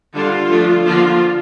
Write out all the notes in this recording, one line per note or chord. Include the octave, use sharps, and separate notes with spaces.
D3 G3 D4 F4
F3 A3 D4
D3 F3 A#3 D4 F4